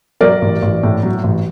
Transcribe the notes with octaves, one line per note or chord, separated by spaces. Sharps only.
F#3 A#4 D5
A1
A1
A2
F#3
A1